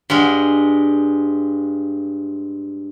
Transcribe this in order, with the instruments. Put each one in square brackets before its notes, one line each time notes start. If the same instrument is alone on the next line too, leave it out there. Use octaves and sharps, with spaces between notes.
[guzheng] G2 G#3